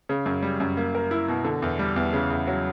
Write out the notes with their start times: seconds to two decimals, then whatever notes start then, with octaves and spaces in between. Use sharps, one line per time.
0.09 C#3
0.26 F#2
0.43 G3
0.60 F#2
0.77 A#3
0.95 A#4
1.11 E4
1.28 B2
1.44 D3
1.62 E2
1.79 G3
1.96 E2
2.13 C#3
2.30 E2
2.47 F#3